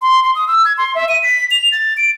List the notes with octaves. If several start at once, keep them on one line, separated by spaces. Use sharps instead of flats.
C6
C6
D#6
E6
G#6
C6
E5
D#7
B6
F7
A6
D7